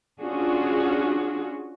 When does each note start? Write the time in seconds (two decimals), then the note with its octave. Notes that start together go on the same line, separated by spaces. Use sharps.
0.21 C#4 D4 F4 F#4 G#4